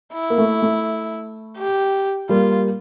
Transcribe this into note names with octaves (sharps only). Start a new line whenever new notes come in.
E4
A#3
A3
A3
G4
G3 A#3 F4